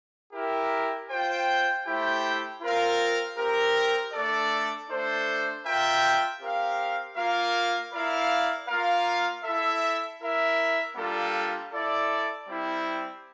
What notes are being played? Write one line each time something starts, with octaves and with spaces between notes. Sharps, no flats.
E4 G4 A#4
F4 C5 G5
A3 E4 G4 C5 G5
C4 F4 A#4 F5
C4 G4 A#4
A3 D4 A4 D5
A3 D4 A4 C5
F4 A#4 E5 G5
C4 G4 A#4 F5
A#3 F4 A#4 F5
E4 A#4 D5 F5
A#3 F4 A#4 F5
E4 A4 E5
E4 A#4 E5
G3 A#3 D4 F4 A4
E4 A4 D5
G3 C4 E4